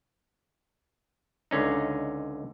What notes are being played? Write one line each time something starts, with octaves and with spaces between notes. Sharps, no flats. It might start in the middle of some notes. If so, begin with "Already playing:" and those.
C#2 D3 C#4 D#4